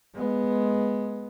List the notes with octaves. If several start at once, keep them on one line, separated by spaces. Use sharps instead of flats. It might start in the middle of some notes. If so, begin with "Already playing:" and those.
G#3 B3